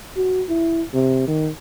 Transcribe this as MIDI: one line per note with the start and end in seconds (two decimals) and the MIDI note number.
0.16 0.43 66
0.49 0.82 64
0.94 1.27 48
1.27 1.49 51